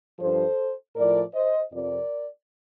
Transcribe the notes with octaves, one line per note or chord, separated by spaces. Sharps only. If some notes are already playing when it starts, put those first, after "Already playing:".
G2 F3 A4 C5
A2 F3 A#4 D5
C5 D#5
F2 C3 F3 A#4 D5